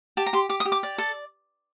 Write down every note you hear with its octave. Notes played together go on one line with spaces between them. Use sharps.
G4 A5
A#5
G4 C6
G4 D6
D#6
G4
D6
D5
A4